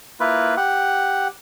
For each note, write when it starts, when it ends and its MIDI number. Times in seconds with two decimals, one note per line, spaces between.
0.20 0.55 58
0.20 0.55 64
0.20 0.55 65
0.20 0.55 71
0.57 1.28 67
0.57 1.28 78